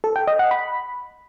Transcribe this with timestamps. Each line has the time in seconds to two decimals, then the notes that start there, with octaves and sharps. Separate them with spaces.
0.04 A4
0.16 G5
0.27 D#5
0.39 F#5
0.51 B5